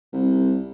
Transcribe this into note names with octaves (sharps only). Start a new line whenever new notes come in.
C2